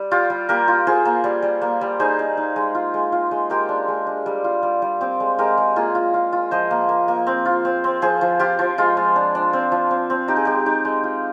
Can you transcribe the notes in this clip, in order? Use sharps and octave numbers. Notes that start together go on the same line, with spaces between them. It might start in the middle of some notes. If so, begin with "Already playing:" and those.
Already playing: G3
F4 G4
G3
A#3 G4 A#4
F4
F4 G#4 C5
A#3
G3
G3
A#3
G3
D#4 G#4 C5
D#4
D#4
G#3
F4
G#3
F4
G#3
G#3 G4 A#4
D4
G#3
D4
G3
F4
G3
G3
C4 G4
G#3
G#3 G4 A#4
G#3
A#3 F4 G#4
F4
F4
F4
F3 C5 D#5
A#3
A#3
A#3
C4
F4
C4
C4
F3 G#4 C5
F3
F4 G4
F3
G#3 F4
G#3
D4
D4
C4
F3
C4
C4
D#4 G4
G#4
G#3 G4
D#4 G4
G#3
F4